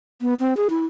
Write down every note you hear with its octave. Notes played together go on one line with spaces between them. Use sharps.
B3
C4
G#4
E4